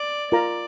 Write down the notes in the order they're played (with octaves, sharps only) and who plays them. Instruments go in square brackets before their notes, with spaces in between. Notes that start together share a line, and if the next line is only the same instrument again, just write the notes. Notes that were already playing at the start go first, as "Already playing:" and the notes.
Already playing: [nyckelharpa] D5
[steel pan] F4 A#4 F5 A#5 [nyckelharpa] D5